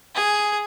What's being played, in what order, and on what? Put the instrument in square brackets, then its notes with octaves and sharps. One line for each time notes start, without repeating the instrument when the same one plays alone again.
[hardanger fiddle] G#4